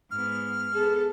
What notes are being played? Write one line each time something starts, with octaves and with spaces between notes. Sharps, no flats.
G#2 B3 F6
B3 G#4 A4